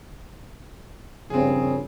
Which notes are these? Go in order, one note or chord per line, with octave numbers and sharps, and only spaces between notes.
A#1 G2 C#3 C4 G#4